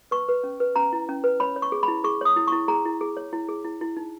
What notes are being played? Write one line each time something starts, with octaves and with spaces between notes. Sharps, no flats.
B4 C#6
B4
C#4
B4
C#4 A#5
E4
C#4
B4
C#5 B5
C#5
C#6
G#4
B5
E4
G#4 C#6
C#5 D#6
E4
C#6
E4
G#4 A#5
E4
G#4
C#5
E4
G#4
E4
E4
D#4